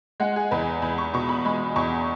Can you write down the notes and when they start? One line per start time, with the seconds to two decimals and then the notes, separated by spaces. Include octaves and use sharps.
0.20 G#3 F#5
0.36 G#4
0.51 E2 B4
0.82 E2 B5
0.98 C#6
1.14 B2 C#6
1.29 B5
1.45 G#3 B5
1.76 E2 C#6